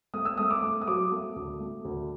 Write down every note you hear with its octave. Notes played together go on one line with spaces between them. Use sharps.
A3 D#6
E6
A3 D#6
D6
A3
D#6
F#3 D6
A3
D2
A3
D2